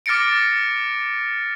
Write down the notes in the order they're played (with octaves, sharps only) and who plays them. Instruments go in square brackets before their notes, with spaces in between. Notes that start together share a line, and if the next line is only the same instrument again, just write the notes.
[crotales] D6 F6 A6 A#6 C#7 D7